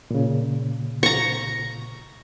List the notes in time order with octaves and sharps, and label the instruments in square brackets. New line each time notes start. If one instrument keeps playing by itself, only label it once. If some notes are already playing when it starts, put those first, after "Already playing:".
[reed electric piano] A#2 C#3
[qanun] A#5 C#6